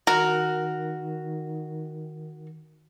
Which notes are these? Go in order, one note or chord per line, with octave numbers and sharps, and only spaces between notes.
D#3 F#4 A#4